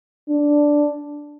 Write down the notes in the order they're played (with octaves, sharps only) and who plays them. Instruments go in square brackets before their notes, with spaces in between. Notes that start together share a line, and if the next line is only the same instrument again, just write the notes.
[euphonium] D4